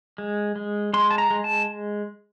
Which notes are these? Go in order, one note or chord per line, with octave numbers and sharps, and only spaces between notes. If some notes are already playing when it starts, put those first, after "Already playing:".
G#3
G#3
G#3 C6
A5
A#5
G#3
A5